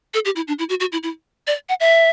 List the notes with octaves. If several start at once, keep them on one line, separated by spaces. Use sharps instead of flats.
A4
G4
E4
D4
E4
F#4
F#4
E4
E4
D5
F#5
E5